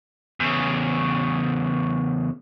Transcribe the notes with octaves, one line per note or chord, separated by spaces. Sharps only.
E2 C#3